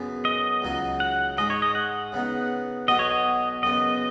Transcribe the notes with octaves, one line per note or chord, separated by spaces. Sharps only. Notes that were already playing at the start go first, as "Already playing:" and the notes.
Already playing: F#2 C#3 B3
D#5
C#2 C#3 F#3 D#4 F#4
F#5
G#2 G#3 D#4 D#5
C#5
D#5
F#5
C#3 B3 D#4
B1 B2 B3 F#4 D#5
C#5
D#5
F#2 C#3 B3 D#5